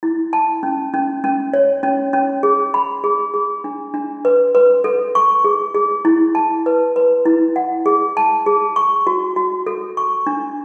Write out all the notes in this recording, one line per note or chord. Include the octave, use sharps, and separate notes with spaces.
E4
A5
C#4
C#4
C#4
C#5
C#4
C#4
G#4
B5
G#4
G#4
D4
D4
B4
B4
A4
C#6
G#4
G#4
E4
A5
B4
B4
E4
F#5
G#4
A5
G#4
C#6
F#4
F#4
A4
C#6
D4